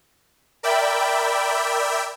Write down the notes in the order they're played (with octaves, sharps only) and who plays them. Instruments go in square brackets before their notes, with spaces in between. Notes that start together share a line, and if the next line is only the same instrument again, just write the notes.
[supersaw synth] A#4 D5 E5 G5 B5